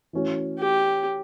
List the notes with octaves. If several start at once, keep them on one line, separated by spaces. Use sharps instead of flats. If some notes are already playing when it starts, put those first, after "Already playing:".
E3 A3 C#4 F#4 C#5
G4